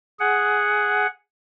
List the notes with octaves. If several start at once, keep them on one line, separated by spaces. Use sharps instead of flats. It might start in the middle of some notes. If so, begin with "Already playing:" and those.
G#4 F#5